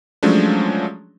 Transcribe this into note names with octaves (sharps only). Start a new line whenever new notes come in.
F3 F#3 G#3 A3 C#4 D4